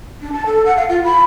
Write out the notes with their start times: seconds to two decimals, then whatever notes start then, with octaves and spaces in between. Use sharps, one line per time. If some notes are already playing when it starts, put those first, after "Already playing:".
0.21 D4
0.33 A5
0.46 A4
0.66 F#5
0.77 F5
0.89 F4
1.04 B5